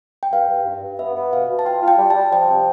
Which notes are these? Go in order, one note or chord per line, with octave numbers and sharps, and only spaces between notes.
G5
G2 F5
G2
G2
G2
B3 E5
B3
B2 F5
B2
A5
F4 G5
F4
G5
G3
A5
G3
F3 G5
C3